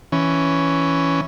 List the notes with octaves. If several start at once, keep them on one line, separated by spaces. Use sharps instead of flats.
E3 C#4